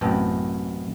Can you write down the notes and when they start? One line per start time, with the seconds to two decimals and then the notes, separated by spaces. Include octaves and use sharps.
0.01 A1 F#2 C3 B3 G5 A5